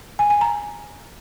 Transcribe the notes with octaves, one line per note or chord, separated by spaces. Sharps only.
G#5
G#5
A#5